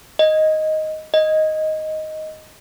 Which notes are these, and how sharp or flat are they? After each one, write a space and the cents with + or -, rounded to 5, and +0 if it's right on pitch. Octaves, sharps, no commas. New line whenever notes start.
D#5 +5
D#5 +5